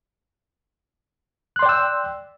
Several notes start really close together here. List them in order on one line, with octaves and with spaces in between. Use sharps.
F#6 C6 D5 G5 E6